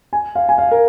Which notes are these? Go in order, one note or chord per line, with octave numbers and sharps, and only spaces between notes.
G#5
F5
G#5
F5
A#4